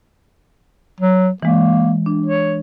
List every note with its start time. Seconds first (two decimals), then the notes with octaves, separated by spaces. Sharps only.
1.00 F#3
1.43 E3 G#3 A#3
2.06 D4
2.26 C#5